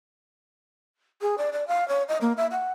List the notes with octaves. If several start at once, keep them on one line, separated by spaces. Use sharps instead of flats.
G#4
D5
D5
F5
C#5
D#5
A#3
E5
F#5